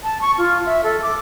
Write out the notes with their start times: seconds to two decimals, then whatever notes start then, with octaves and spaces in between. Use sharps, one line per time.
0.04 A5
0.21 C#6
0.38 F4
0.66 E5
0.84 A4
1.03 D6